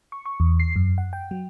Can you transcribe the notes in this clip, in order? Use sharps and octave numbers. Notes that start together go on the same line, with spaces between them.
C#6
C#6
E2
C7
F#2
F#5
G5
F#3